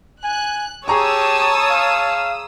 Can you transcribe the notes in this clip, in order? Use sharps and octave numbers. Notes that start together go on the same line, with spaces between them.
G#5 F#6
G4 G#4 C#5 A5 A#5 C#6 D#6 E6
F5